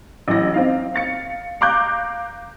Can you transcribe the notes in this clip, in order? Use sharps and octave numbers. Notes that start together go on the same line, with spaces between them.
A1 E3 F#3 A#6
C4 D#4 F5
F5 A6 C#7
F5 A#5 D6 F#6 G6